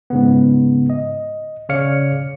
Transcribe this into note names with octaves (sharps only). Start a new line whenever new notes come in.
G#2 C#3 B3
D#5
C#3 C#5 D5 F5 F6 C#7